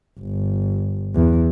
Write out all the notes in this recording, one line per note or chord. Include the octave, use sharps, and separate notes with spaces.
G1
E2